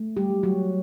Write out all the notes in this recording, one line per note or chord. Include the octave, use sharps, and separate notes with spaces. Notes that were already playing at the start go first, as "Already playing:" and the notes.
Already playing: A3
G3 G4
F#3
F#3 F#4